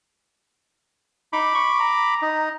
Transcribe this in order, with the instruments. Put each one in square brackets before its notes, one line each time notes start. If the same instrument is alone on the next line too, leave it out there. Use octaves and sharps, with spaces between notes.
[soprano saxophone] D#4 [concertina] B5 D6
[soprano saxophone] C#6
A#5
[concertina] D#4